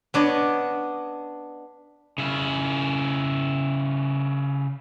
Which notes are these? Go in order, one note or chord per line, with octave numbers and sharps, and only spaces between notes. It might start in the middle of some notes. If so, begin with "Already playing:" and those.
B3 D4 C#5 D#5
C#3 E4